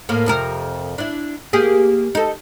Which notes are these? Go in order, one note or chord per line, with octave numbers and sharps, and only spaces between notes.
A2 A#3
F2 C3 A#4
D4 E4
A#3 G4 G#4
D#4 A4